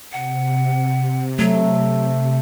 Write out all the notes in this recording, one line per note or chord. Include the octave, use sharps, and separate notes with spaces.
C3 F#5
F#3 A3